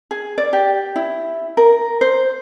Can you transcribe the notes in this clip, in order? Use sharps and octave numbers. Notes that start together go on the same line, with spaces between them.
G#4
D5
G4
E4
A#4
C5